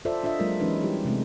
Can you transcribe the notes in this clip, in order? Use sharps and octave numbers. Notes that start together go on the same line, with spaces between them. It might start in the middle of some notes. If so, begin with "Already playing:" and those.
F4 A4 C5 D5 E5
D4 F4 D#5 E5
F#3 G#3 A#3 F4 A#4
E3 G#3 C#4 D#4 B4
G3 E4 G4
C3 G#3 A3 C4